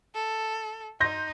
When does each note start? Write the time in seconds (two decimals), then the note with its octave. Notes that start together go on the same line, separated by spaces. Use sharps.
0.15 A4
1.00 D#4 C6 G6 A#6